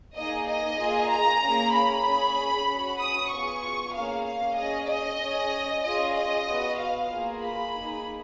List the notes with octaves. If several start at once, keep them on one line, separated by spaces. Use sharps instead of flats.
A#3 D#4 G#4 D#5
D#5
A#3 F4 G#4
A#5
A#3 C#4 G#4
B5
C#4 G#4
C#4 F#4
D#6
B3 F4 G#4 C#6
A#3 C#4 G#4 F5
F5
C#4 G#4 D#5
D#5
C#4 G#4
C#4 F4 G#4 D#5
D#5
B3 F#4
F5
A#3 F4 G#4
B5
A#3 D#4 G#4